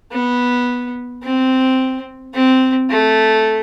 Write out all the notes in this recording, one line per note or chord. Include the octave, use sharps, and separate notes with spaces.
B3
C4
C4
A3